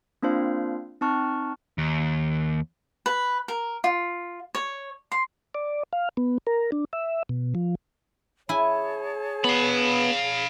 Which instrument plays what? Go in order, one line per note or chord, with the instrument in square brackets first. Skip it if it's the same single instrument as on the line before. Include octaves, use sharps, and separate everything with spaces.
[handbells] A#3 C4 D4 F4 C5 F5
C4 D#4 A5 C#6 F6 F#6
[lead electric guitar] D#2
[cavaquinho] B4
A#4
F4
C#5
C6
[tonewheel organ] D5
F5
B3
A#4
D4
E5
B2
F3
[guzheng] E4 G#5 [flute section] G#4 C#5 A5
[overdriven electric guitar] B3 [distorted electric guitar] F5 B5